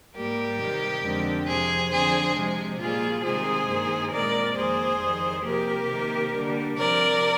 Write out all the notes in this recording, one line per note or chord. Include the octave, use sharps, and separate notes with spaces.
G#2 G3 A#3 G4 A#4
C3 D#3 G3
F2 D3 G#3 C4
F2 C3 F3 G#4 C5
D3 F3 C4 G#4 C5
C3 F3 G#3
A#2 G3 A#3 F4 G#4
C3 D#3 G#3 C4 G#4 C5
G2 D#3 A#3
A#2 G#3 C4 A#4 D5
F2 D#3 A#3 G#4 C5
F2 D#3 G3
C3 F3 A#3 G4 A#4
C3 D#3 A#3
D3 G3 A#3
C3 F3 C4 A#4 D5